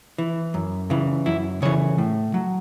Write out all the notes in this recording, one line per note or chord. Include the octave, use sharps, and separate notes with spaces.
E3
F#2
C#3 E3
F#2 E4
C#3 E3 C#5
A2
F#3